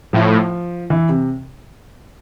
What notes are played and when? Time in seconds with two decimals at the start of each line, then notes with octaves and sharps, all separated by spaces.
0.13 A2 F3
0.90 E3
1.09 C3